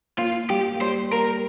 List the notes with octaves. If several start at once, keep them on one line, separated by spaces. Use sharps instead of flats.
A#3 F4
G3 G4
A#3
G3 C5
A#3 A#4